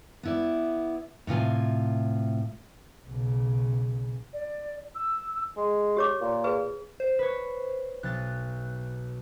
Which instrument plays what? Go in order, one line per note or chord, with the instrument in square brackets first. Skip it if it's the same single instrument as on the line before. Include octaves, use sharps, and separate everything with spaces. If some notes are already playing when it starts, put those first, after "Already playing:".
[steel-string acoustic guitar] B3 E4 D5
A2 C3 F4 G#5
[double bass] B1 C#3
[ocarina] D5
E6
[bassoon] G#3
[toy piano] G4 C#5 D6
[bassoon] A#2
[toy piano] G#4 B4
[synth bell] C5
[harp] B4 C#5
[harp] B1 A6 [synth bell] F#6